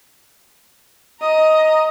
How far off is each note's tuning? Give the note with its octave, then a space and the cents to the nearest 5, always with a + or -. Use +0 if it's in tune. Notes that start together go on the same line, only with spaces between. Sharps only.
D#5 +10 A#5 +0